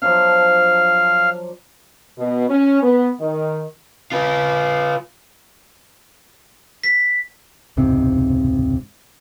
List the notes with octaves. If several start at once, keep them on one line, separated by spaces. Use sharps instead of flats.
F3 F#3 D4 F5
B2
C#4
B3
D#3
F4 B4
B6
E1 C#2 G#2 C3